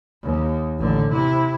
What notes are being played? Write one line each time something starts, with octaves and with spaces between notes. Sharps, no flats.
D#2
A1 D3
C3 E4